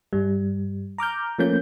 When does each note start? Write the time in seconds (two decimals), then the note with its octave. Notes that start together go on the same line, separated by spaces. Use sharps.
0.13 G2 G3
0.98 A#5 D6 F6 G6
1.39 F3 A3 A#3 C#4 G6